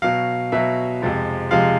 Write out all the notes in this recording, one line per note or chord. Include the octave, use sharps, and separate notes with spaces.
B2 F#3 F5
B2 F#3 E5
F2 C3 F3 G#3
F2 C3 F3 G#3 F5